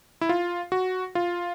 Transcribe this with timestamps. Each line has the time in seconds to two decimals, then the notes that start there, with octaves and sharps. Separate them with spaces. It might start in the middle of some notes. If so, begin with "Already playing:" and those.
0.21 E4
0.29 F4
0.72 F#4
1.15 F4